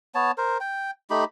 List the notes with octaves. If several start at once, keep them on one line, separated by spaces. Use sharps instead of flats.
B3 C#5 A5
A#4 C5
G5
A3 D#4 G4 B5